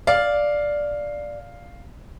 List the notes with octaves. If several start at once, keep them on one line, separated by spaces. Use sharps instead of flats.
D5 F5